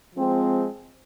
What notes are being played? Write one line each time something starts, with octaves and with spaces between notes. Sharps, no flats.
F3 G#3 C4